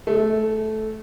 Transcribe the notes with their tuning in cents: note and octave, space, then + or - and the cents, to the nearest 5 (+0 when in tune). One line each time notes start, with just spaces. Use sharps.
A3 -15 G#4 +0